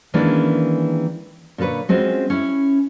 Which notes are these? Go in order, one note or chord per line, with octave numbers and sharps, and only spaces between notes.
D#3 E3 G#3 A#3 C#4 D4
A#2 D3 A4 B4 C#5
G#3 C4 C#4 F4 F#4
C#4 E4